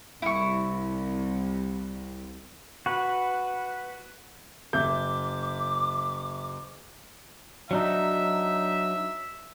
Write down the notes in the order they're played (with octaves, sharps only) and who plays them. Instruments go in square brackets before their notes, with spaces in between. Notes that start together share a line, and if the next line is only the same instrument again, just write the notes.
[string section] C2 [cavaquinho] E4 C#6
[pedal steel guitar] F#4 B4
[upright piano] F#1 E5 G6 [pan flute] D6
[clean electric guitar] F#3 D4 D#4 [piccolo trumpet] E5